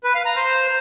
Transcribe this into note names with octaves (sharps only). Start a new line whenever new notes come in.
B4
F5
A#5
C5